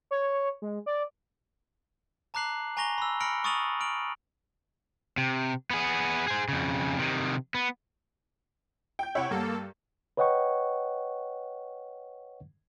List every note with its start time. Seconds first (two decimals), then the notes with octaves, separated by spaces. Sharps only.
0.11 C#5
0.62 G#3
0.86 D5
2.34 A5 A#5 D6 F#6 C7 F#7
2.77 G#5 A#5 C#6 A#6 F7 G7
2.98 B5 E6
3.20 B5 F6 A#6 C#7 D7 F#7
3.44 C#6 D#6 A6 D#7 F7 F#7
3.80 F6 D7 F7 F#7
5.18 C3
5.71 B3 G#4
6.28 G#4 C5
6.48 F2 C#3
6.99 C3 D#3
7.54 B3
8.99 G5 G6
9.15 C3 E4 C#5 F#5 G5
9.31 G2 A#3 A4
10.17 B4 C#5 D#5 F#5 G5 C#6